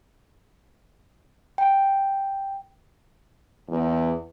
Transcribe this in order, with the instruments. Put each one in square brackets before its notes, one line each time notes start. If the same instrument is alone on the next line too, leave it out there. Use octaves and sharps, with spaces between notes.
[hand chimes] G5
[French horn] E2